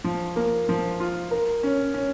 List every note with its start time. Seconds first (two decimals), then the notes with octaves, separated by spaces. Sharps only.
0.04 F3
0.36 A#3
0.69 F3
1.00 F4
1.31 A#4
1.63 C#4
1.94 C#4